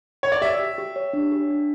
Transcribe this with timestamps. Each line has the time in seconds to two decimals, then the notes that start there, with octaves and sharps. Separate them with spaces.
0.23 C#5
0.32 D5
0.42 G4 E5
0.59 G4
0.78 G4
0.96 C#5
1.13 D4
1.32 G4
1.50 D4